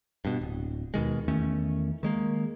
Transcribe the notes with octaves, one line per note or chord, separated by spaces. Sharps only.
G2 B2
D1
D#2 B2 D#3 G#3
E2 D#3 A3 C#4
D#3 G#3 A#3